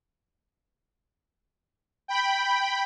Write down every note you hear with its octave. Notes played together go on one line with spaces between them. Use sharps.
G5 B5